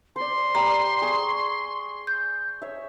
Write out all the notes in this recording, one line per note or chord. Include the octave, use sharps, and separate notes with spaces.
C5 D5 C6
G3 C5 A#5 D6
G#4 C#6
G6
C#5 E5